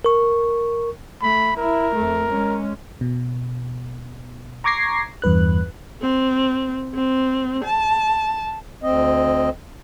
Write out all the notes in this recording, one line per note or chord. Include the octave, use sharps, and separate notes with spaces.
A#4 C#6
A3 B5
E4 A#4
F2 A3
G#3 C#4
B2
A#5 C#6 D6 G#6 A#6 C7
E2 G2 B4 F#6
C4
C4
A5
D2 C4 D#5